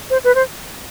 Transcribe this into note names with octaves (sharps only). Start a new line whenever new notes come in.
C5
B4
C5